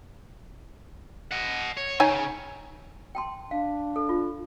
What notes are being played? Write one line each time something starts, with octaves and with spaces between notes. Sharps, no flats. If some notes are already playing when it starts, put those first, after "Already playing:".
D#5 F#5
C#5
C#3 D#4 C#5 G#5
G5 A5 C6
D4 F5
A4
F4